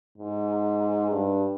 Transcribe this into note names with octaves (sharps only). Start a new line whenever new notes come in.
G#2
G2